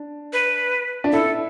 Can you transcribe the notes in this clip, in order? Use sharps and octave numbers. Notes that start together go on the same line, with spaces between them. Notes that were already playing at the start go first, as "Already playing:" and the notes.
Already playing: D4
B4
D4
E4 A4